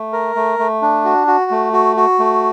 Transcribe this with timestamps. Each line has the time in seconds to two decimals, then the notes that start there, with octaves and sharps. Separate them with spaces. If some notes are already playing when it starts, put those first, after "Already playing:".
Already playing: A3
0.13 A#4
0.36 A3
0.59 A3
0.82 D4
1.05 F#4
1.27 F#4
1.51 A3
1.73 F#4
1.97 F#4
2.19 A3